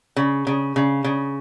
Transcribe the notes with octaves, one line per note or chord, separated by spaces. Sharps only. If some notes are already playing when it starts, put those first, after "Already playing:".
C#3
C#3
C#3
C#3